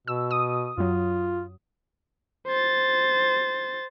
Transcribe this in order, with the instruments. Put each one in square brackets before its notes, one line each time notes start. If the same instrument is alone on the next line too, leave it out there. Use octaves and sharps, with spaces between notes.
[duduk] B2 [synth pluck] E6
[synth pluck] D#6 D#7
[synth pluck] F#2 F#3 [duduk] F4
[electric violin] C5 A6